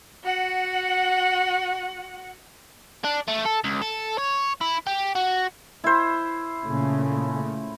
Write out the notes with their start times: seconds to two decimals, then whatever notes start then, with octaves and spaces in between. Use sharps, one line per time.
0.24 F#4 F#5
3.04 D4
3.28 A3
3.45 A4
3.64 C#2
3.82 A4
4.18 C#5
4.61 E4
4.87 G4
5.15 F#4
5.84 E4 C5
6.64 A#2 C#3 A3